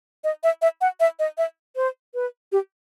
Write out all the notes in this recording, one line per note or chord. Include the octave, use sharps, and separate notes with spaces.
D#5
E5
E5
F#5
E5
D#5
E5
C5
B4
G4